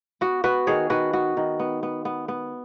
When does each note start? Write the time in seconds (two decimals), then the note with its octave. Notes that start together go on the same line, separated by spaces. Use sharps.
0.21 B3 F#4
0.44 B3 F#4 B4
0.67 D#3 G#4 C#5
0.90 D#3 F#4 B4
1.13 B3 F#4
1.37 D#3
1.59 B3
1.83 B3
2.05 B3
2.28 B3